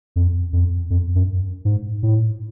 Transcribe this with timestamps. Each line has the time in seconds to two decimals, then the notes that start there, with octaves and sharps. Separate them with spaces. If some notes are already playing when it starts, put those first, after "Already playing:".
0.16 F2
0.53 F2
0.90 F2
1.15 F#2
1.65 G#2
2.03 A2